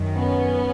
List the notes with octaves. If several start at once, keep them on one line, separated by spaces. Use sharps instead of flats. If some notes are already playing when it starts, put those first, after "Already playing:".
Already playing: F#2 D#3
B3 C#4